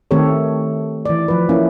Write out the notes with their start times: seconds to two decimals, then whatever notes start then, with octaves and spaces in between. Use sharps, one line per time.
0.11 D#3 A3 C4 G4 A4 C#5
1.06 E3 D5
1.28 F3 B4
1.49 A#3 C#4 E4